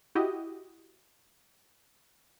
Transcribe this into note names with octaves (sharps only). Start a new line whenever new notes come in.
E4 F#4 G4 D#5